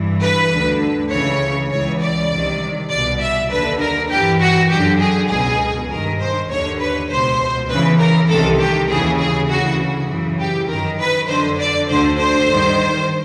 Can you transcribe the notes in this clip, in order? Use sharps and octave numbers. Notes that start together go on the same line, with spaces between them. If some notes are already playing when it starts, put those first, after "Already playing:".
Already playing: G2 E3
B4
D2 D3
C#2 C#3 E3 C#5
C#2 C#3 E3 C#5
D5
C2 C3 D#3
C2 B2 D5
E5
D#2 D3 B4
A#4
G2 E3 G4
F#4
F#2 D3 G4
G#4
C#2 B2 G#4
G2 D#3 A#4
C5
D#2 D3 C#5
B4
C#2 B2 C5
E2 C#3 E3 B4
A#4
C2 C3 D#3 A4
G4
D#2 C#3 E3 G#4
G#4
D2 C#3 E3 F#4
F#2 C#3 E3
G4
F#2 D#3 A#4
B4
F2 D3 C5
D5
D2 D3 C5
C5
G2 D#3